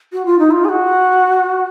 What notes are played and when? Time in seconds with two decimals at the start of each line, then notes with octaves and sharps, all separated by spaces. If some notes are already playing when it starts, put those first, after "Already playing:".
0.12 F#4
0.25 F4
0.39 D#4
0.51 F4
0.64 G#4
0.69 F#4